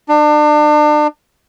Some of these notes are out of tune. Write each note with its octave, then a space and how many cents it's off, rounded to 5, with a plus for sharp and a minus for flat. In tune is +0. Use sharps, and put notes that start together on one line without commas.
D4 +35